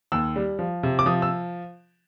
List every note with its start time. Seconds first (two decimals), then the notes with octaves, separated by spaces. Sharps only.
0.12 D#2 E6
0.36 G3
0.59 F3
0.83 C3
0.99 D6
1.06 F3 D#6
1.22 E6